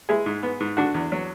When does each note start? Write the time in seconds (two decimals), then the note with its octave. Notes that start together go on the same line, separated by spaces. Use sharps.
0.09 G#3 E4 G#4
0.26 G#2
0.43 B3
0.60 G#2
0.77 D3 D4 F#4
0.94 E2
1.12 F#3